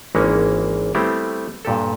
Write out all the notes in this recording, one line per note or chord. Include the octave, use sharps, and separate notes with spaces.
G#1 E3 G#3 A#3 C#4
G3 A3 B3 C4 E4 G4
G2 A#2 G4 A4